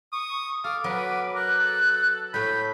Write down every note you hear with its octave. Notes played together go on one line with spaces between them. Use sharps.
C#6 D#6
A4 F5 D6
F#3 B3 B4
A#4 F#6
A4
A2 A3 B5 G6